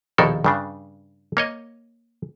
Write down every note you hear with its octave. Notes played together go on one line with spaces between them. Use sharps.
A#1 D#2 B2 D#3 A4 A#4
G2 C#3 D4
A#3 C#5 D#5